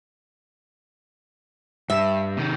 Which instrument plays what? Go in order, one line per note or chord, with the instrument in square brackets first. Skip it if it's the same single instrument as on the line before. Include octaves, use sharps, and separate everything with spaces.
[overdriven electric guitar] G2 [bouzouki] E5
[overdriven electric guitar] C3 D#3